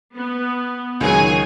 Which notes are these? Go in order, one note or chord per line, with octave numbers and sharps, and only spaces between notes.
B3
C#2 D#3 F#3 G#4 C#5 G#5